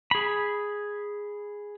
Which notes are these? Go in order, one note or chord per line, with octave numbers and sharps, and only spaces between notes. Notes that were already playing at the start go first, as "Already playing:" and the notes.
G#4 B5